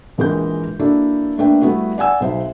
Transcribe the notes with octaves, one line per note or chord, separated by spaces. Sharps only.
A#1 E3 G#3 A#4 B4 G6
A#3 D4 E4 F#4 A4 D5
A3 A#3 D4 B4 E5 G5
G3 A3 B3 E4 F#4
D5 F#5 G#5 E6
B1 C5 E5